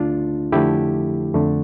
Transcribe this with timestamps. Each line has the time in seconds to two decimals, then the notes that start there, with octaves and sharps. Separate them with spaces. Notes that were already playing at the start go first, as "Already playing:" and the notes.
Already playing: D2 D3 A3 D4 F4
0.52 F2 D3 F3 A3 E4 G4
1.34 F2 D3 A3